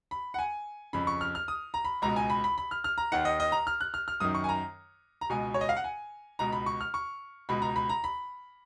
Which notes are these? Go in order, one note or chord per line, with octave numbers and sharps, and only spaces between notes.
B5
F#5
G#5
F2 C#3 B5
C#6
F6
F6
D#6
A#5
B5
C#2 B2 A#5
G#5
B5
B5
B5
F6
F6
A#5
D#2 D#3 F#5
D#5
D#5
A#5
F6
F#6
F6
F6
F#2 D#3 D#6
C#6
G#5
A#5
A#5
C#2 B2 G#5
C#5
D#5
F5
F#5
G#5
C#2 B2 A#5
B5
C#6
F6
C#6
C#2 B2 B5
A#5
B5
A#5
B5